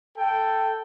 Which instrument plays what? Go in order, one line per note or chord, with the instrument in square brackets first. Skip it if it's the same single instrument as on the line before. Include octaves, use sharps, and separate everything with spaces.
[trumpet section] A4 G5